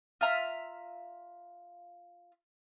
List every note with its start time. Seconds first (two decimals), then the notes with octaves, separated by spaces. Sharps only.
0.21 F4 E5 A#5 F6